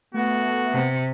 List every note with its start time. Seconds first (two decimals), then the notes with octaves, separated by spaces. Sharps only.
0.14 A3 B3 F#4
0.73 C3